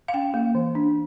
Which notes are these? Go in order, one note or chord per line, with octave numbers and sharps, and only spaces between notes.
F5
C#4 G5
A#3
E3
D4